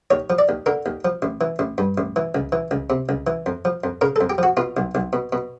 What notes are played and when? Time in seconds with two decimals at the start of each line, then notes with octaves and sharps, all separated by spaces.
0.10 D#2 C#5
0.30 F3
0.39 D5
0.49 D#2
0.66 D3 A#4
0.86 D#2
1.05 F3
1.22 A1
1.41 E3
1.59 A1
1.78 G2
1.98 A1
2.16 E3
2.35 C#2
2.52 E3
2.71 C#2
2.90 C3
3.09 C#2
3.27 E3
3.46 F2
3.65 F3
3.84 F2
4.01 C#3 A#4
4.16 A4
4.21 F2
4.30 G4
4.38 F3 F#4
4.57 B2 F4
4.77 B1
4.95 B1
5.13 B2
5.33 B2